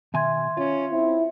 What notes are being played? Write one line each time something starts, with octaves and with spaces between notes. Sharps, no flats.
B2 D#3 E5 G#5 C6 G#6
C#4 F4
C4 E4